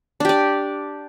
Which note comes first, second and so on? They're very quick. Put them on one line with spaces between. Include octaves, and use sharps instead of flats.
D4 G4 D5